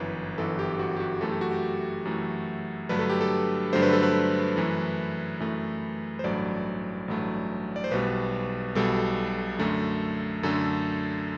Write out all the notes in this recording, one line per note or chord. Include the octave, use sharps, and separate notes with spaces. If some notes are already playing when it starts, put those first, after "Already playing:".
Already playing: G1 F#2 E3 B4
G1 F#2 E3 A4
G4
F#4
G4
F#4
F#2 E3 A3 A4
G4
F#4
G4
F#2 E3 A3
G2 D3 F#3 A3 B4
A4
G4
A4
G2 D3 F#3 A3 C5
B4
A4
B4
F#2 E3 A3
F#2 E3 A3
C5
A1 G2 F#3 A3 D5
A1 G2 F#3 A3
D5
C5
B1 B2 G3 B4
B1 B2 G3 A4
F#2 D3 A3
F#2 D3 A3 A4